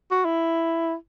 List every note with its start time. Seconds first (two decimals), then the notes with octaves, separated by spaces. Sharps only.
0.11 F#4
0.25 E4